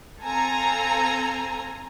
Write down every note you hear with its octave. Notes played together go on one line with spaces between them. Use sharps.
C4 A4 F5 G#5 A#5